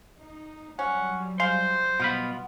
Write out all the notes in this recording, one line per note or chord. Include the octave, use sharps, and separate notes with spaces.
D#4
F#3 G3 C#4 F#5
G#3 C5 F5 C6
B2 B3 F4 B5